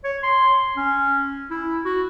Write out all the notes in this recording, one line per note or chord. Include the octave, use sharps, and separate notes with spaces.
C#5
C6
C#4
E4
F#4